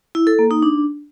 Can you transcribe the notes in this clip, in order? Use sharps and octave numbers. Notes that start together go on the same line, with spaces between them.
E4
A4
A#3
D#4
D4